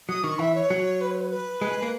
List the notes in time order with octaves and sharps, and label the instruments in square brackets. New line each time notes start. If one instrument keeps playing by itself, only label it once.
[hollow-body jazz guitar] F#3 [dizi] D#6
[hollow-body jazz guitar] D#3 [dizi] C#6
[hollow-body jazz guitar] E3 [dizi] E5
[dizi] C#5
[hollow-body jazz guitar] F#3
[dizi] B4
C#5
B4
B4
[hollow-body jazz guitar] G#3
G#3
A#3